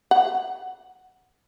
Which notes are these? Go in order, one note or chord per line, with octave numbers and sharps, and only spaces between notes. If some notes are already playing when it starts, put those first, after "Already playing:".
F#5